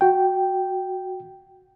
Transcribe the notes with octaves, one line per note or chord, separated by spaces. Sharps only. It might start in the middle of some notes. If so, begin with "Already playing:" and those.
F#4 G5